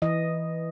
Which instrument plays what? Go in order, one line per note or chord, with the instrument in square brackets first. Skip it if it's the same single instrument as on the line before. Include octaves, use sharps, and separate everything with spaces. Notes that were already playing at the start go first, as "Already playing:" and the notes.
[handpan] E3 D#5